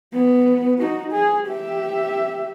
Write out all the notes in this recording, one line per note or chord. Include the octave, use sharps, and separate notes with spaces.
B3
D#4 F#4
G#4
G4 E5